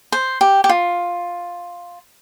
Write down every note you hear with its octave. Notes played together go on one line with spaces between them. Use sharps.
C5
G4
G4
F4